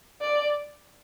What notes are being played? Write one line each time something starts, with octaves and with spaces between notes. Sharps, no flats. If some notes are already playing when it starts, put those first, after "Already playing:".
D5